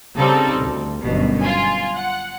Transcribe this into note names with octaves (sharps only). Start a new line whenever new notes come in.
C#3 G3 C4 D#4 A4
D2
G1 F#2 B2
F4 G#5
F#5